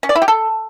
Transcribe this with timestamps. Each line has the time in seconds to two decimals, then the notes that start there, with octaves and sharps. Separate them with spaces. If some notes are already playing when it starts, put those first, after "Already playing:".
0.03 C#4
0.09 D5
0.15 E4
0.22 G4
0.28 A4